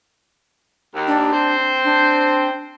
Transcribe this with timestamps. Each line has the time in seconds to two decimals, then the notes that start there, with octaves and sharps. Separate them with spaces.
0.95 D#2
1.08 D4
1.33 C4 C5
1.85 D4